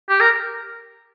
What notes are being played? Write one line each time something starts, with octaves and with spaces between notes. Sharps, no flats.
G4
A#4